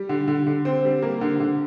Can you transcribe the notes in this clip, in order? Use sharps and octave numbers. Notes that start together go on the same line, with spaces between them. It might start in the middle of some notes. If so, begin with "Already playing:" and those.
Already playing: G3
D3
D3
D3
C4
G3
A#3
D3
D3